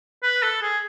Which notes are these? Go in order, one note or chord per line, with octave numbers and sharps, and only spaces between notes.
B4
A4
G#4